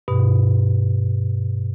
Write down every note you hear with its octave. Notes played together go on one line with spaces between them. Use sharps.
G2 B2